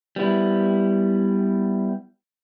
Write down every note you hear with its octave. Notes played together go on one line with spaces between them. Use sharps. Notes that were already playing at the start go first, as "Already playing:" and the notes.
G3 B3 E4